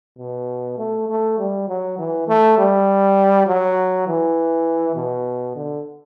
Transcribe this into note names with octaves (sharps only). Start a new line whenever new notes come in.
B2
A3
A3
G3
F#3
E3
A3
G3
F#3
E3
B2
D3